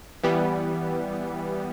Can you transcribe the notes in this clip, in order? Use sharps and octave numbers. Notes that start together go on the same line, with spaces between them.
E3 G3 B3